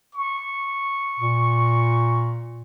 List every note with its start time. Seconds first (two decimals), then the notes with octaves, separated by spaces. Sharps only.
0.14 C#6
1.20 A#2